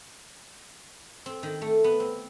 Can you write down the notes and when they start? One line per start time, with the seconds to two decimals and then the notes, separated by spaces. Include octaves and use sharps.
1.26 C4
1.43 D#3
1.62 A3
1.84 B3
2.00 C4